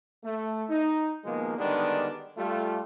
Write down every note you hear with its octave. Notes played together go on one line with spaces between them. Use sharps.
A3
D#4
B2 D#3 F3 G#3 A#3
D3 D#3 G3 G#3 B3 D4
G3 A3 F4